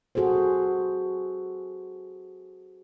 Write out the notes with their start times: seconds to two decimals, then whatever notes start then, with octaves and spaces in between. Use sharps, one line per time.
0.15 F#4 G#4 A4 C5